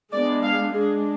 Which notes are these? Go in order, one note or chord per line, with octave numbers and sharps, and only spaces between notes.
G#3 B3 D4 D5
F5
G#3 D4 G#4